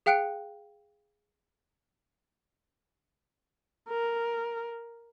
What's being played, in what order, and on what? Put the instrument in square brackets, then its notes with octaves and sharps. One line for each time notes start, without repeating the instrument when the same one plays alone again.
[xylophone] G#4 F5 G5 F#6 C#7 D7
[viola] A#4